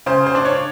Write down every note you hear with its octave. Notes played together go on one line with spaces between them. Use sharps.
C#3 C5
C5
D4
C#5